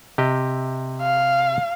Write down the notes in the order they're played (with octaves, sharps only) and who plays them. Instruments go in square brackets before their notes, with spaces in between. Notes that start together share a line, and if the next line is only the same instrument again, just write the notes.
[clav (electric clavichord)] C3 G4 D#5
[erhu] F5